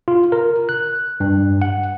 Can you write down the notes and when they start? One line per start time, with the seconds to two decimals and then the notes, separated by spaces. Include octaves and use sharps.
0.08 F4
0.32 A#4
0.69 F#6
1.20 G2
1.62 F#5